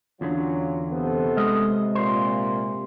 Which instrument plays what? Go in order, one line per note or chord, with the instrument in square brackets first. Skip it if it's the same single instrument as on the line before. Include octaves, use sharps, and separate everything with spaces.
[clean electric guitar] E2 D3 [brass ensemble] F#3 C#4 F4
[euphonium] C3 [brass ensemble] B3 A4 C5
[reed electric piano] G#3 F6 [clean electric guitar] D#5
[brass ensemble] A#2 [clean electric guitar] C5